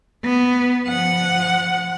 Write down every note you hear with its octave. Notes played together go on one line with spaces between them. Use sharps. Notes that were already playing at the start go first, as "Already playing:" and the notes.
B3
F3 F#5